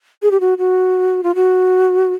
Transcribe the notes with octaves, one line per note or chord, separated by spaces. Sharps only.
G#4
G4
F#4
F#4
F4
F#4